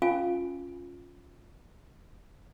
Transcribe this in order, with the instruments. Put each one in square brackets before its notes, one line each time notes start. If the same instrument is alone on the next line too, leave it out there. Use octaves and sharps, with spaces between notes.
[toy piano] C#4 F4 F5 G#5